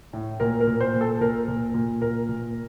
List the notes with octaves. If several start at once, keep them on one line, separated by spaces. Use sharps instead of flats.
A2
A#2 A#4
A#4
A#2
C5
A#2
A4
A#2 A#4
A#2
A#2
A#2 A#4
A#2